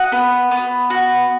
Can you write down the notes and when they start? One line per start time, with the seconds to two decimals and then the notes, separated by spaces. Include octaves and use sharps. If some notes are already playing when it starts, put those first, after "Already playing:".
Already playing: F#4 D#5 F#5
0.12 B3
0.51 B3
0.90 F#4